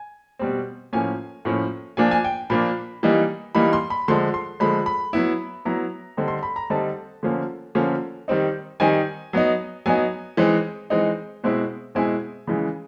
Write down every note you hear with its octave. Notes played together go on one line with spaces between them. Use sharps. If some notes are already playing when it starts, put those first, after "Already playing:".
Already playing: G#5
B2 G3 C4
A2 F3 A#3 C#4 G#5
A2 F3 A#3 C#4
A#2 F3 A#3 D4 G#5
G#5
G5
A#2 F3 A#3 D4 B5
E3 G3 A#3 D#4
E3 G3 A#3 D#4 B5
C6
B5
D3 F3 G#3 C6
C6
D3 F3 G#3 B5
B5
F#3 B3 E4
F#3 B3 E4 A#5
D3 G3 C4 D#4
C6
B5
A#5
D3 G3 C4 D#4 A5
D3 F3 A#3 C#4
D3 F3 A#3 C#4
D#3 G3 C4 D#4
D#3 G3 C4 D#4 G#5
F#3 B3 D#4
F#3 B3 D#4 G#5
E3 G#3 C4 D#4
E3 G#3 C4 D#4
B2 G#3 C4 E4
B2 G#3 C4 E4 G#5
C#3 E3 G#3